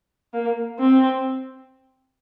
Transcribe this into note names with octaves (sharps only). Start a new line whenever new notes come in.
A#3
C4